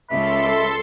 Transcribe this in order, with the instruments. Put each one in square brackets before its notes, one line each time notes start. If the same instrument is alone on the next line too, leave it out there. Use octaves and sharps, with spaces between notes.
[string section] C#2 [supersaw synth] A4 C6 [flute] E5 [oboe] B5